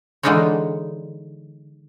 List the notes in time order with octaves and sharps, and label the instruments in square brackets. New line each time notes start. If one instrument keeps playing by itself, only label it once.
[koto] D3 E3 G#3 D#4 F4 C#5